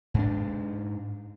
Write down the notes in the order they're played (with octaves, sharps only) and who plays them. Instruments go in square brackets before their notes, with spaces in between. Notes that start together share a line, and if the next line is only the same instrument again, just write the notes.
[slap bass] G#2 D4